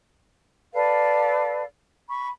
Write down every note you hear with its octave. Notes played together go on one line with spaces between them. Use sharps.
A4 B4 D5 F5
B5 C#6